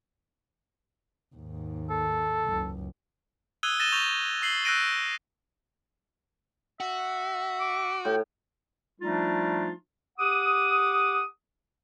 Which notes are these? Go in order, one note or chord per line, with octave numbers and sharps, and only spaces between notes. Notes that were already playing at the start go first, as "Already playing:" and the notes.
D#2 G#2
A4
F#1 C#2
D#6 E6 F#6 G#6 D#7 G7
A6 A#6 D#7 E7 G7
C#6 G6 A#6 F7
E6 C7 F#7 G7
E6 F#6 G6 A#6 D7 D#7
F#4 E5
D6
A2 G5
F3 G3 A3 D4 D#4 F4
G4 F#5 D6 D#6